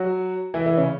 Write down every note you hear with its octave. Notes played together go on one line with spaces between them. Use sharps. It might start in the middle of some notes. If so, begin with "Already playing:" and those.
Already playing: F#3 F#4
E3 E4
E3 E4
C#3 C#4